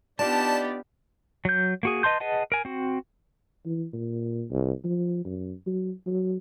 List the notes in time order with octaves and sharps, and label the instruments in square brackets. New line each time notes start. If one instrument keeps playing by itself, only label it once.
[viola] B3 G4 [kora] D4 F4 F5 [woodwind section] D#4 D5 [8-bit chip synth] A5
[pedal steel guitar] F#3 G6
A#3 F#4 G#4
B4 D#5 A5 C6 G6
G#4 B4 D#5 F#5 A5
A#4 G#5
C4 F#4
[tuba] E3
A#2
C2
F3
F#2
F#3
F#3